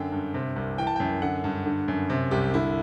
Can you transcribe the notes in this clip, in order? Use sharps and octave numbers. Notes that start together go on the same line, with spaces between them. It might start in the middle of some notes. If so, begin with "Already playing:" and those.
Already playing: F#2 D3 G5
G2
C3
C2
E3 G5
A5
F#2 G5
D3 F#5
G2
D3
F#2
C3
C2 G4
D3 E4